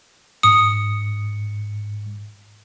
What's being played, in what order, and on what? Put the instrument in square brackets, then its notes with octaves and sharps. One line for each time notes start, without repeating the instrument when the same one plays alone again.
[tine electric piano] G#2 C#7 [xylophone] D#6